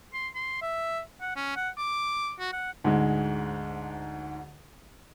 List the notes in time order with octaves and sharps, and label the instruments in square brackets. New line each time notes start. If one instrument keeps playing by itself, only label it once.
[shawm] C6
C6
E5
F#5
C#4
F#5
D6
F#4
F#5
[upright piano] D2 G#2 G#3